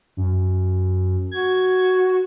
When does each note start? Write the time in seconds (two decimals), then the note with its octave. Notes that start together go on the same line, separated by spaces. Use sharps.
0.17 F#2
1.31 F#4 G#6